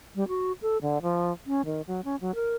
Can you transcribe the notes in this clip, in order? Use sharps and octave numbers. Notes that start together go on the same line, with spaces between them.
G3
F#4
A4
D3
F3
C#4
D#3
F#3
C#4
F#3
A#4